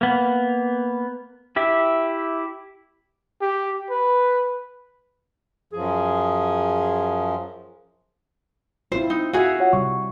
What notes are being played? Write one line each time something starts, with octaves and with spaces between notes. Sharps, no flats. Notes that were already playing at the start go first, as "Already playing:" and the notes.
A#3 B3
E4 G4 E5
G4
B4
F#2 F3 G#4
C4 E4 F4 C5
D#4
F#4 G#4 E5 F5
F4 C#5 F#5
C3 G3 C#6